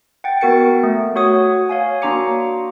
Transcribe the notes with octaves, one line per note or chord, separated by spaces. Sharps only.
F#5 G5 A6
B3 F#4 A#4 A6 C#7
A3
F#4 C#5 F#5 D#6
C#5 F5 G#5
A#3 D4 F#4 A#5 D6 C#7